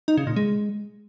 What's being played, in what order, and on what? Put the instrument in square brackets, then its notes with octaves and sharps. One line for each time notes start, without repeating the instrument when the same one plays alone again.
[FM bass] D#4
C#3
A#2
G#3